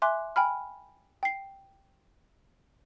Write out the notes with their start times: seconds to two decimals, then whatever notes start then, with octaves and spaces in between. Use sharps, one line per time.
0.02 E5 G#5 C6 D6 F#6
0.36 G5 G#5 B5 F6
1.23 G5 C7